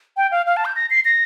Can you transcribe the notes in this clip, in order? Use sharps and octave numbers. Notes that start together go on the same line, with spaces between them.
G5
F5
F5
A5
G6
A#6
C7
A#6